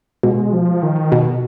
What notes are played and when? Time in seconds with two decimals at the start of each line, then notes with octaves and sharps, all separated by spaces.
0.23 B2 G#3
0.53 F3
0.83 D#3
1.12 B2